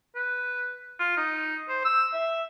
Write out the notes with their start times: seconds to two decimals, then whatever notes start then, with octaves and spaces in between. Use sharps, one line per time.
0.15 B4
0.99 F4
1.17 D#4
1.69 C5
1.85 E6
2.14 E5